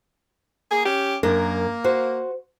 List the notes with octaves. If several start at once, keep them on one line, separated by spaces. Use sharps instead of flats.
A#3 G#4
C#4 G4
F#2 A#3 D4 A#4
F#4 C5